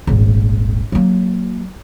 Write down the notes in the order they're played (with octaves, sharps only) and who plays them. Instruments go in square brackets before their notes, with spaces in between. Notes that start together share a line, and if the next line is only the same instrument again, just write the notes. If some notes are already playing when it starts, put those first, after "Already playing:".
[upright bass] D#1 G#1
F#3 A#3